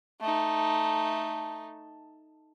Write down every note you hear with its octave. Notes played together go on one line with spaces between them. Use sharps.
A3 D#4